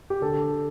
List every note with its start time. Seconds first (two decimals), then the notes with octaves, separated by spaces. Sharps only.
0.10 G4
0.22 D3 A4